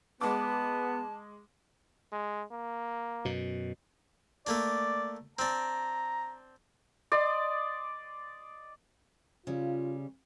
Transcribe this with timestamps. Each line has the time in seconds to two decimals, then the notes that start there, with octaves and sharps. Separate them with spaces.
0.21 G#3 B3 A5 D6
2.12 G#3
2.51 A#3
3.25 F#2 B2
4.47 A3 A#3 D4 D5
5.39 C4 D4 A#5
7.12 D5 D#5 C6
9.47 C#3 G3 F4